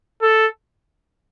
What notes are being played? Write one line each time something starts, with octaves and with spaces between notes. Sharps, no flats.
A4